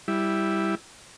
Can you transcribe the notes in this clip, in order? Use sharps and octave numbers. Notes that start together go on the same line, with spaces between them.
G3 E4